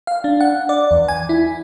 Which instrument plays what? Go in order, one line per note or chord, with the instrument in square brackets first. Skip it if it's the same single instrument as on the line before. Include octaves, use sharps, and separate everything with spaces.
[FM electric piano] F5
D4
F#5
D5
E2
G#5
E4